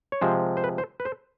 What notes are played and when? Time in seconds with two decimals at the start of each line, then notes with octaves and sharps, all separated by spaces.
0.12 C#5
0.21 C3 F3 G#3 C5
0.57 C5
0.64 B4
0.78 C5
1.00 B4
1.05 C5